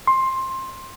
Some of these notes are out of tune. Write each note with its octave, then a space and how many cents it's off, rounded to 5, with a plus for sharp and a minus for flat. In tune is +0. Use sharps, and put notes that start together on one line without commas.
C6 +15